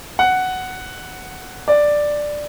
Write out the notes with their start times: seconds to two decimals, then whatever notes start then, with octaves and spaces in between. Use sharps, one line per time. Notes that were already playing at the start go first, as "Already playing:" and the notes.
0.19 F#5
1.68 D5